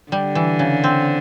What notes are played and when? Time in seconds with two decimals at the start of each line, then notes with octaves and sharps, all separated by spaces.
0.12 D3 G3
0.35 E3
0.59 C#3
0.84 C4